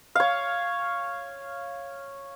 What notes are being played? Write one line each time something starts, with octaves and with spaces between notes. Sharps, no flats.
C#5 F5